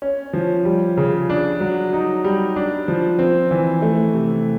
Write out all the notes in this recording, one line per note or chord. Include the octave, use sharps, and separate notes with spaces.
C#4
F3
G3
C#3
D4
F#3
D#4
G3
D4
F3
C4
E3
A3
C3